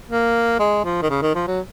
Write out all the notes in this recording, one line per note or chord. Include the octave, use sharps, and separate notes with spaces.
A#3
G#3
F3
D#3
C#3
D#3
F3
F#3